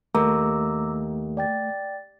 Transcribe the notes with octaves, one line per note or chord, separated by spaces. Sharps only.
D#2 A3 A#5 D6 E6
D5 G5 A6